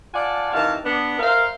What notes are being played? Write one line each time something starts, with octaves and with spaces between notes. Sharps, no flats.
F4 D5 F#5 G#5 A5
C3 D#3 E3 F5 A5
B3 D4
A#4 C5 E5 F5